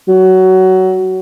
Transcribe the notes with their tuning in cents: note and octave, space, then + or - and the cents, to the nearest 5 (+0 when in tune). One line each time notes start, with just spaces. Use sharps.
F#3 +20